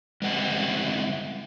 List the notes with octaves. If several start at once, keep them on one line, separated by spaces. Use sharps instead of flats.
G3 G#3 C4 D#5 F#5